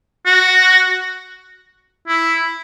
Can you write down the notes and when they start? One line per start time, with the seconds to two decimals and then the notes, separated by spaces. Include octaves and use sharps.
0.26 F#4
2.08 E4